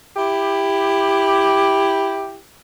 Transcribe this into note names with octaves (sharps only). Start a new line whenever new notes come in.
E4 G4